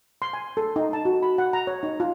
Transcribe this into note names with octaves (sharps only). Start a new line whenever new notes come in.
C6
G#5
A4
D#4
A5
F#4
B5
F#5
A#5
C#5
D#4
F4